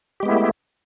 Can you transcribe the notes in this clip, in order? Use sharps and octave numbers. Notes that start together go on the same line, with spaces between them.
G#3 A3 B3 E4 G4